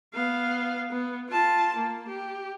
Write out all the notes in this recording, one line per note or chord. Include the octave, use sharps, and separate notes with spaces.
B3 F5
B3
F4 A5
A#3
G4